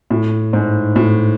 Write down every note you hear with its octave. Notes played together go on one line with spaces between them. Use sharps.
A2
G#2
A2